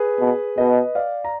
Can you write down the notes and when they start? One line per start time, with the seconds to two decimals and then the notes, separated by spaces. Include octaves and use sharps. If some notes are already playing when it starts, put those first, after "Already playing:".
Already playing: G#4 B4
0.20 B2
0.57 B2 B4 D#5
0.95 D5 F5
1.24 A#5